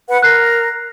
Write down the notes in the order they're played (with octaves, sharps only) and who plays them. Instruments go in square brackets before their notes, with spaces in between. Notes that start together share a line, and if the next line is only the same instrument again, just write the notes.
[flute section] B4 F#5
[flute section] A#4 [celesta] F#6 C7